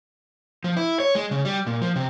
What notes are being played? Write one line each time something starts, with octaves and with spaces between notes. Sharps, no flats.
F3
E4
C#5
G#3
C#3
G3
A#2
F3
C3